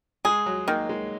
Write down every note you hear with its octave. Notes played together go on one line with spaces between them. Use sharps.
G#3 G#4
F#3
D#3 A#3
G#3